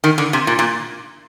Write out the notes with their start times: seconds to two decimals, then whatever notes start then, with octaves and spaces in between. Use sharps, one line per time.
0.04 D#3
0.18 D3
0.33 C3
0.47 A#2
0.59 A#2